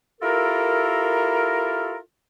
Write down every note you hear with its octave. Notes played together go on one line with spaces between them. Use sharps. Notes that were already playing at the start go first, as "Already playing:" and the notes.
E4 F4 G4 A4 A#4